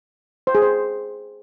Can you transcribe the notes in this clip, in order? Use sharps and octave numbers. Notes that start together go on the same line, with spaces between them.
C5
G#4
C5